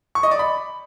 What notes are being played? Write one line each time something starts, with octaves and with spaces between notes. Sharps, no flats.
C#6
D#5
D5
B5